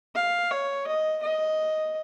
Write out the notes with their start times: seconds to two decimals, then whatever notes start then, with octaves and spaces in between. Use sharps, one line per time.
0.15 F5
0.51 C#5
0.87 D#5
1.23 D#5